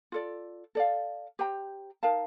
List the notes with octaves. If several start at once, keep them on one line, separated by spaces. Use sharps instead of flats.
F4 A4 D5
A4 D5 F5
G4 C5 G5 A#5
D#4 A#4 F5 A5